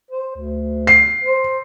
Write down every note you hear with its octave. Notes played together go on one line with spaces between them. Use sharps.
C5
D2
C7
C5